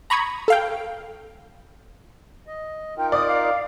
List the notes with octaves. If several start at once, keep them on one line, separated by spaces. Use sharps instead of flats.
A#5 B5 C#6 D#6 G#6
A4 F5 G5
D#5
D#4 F4 A#4 G5
D5 D#6
F5